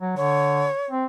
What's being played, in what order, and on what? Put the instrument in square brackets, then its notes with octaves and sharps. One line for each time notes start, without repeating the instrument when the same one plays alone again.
[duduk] F#3
[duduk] D3 [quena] C#5
[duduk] C4